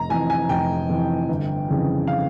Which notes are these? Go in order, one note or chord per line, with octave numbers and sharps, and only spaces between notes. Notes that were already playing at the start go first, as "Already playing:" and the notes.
Already playing: F1 A#5
F2 E3 G#5
G#5
F1 G5
F2 E3
G1
F2 C#3 E3
F5